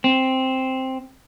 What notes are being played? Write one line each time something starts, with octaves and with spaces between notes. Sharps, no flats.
C4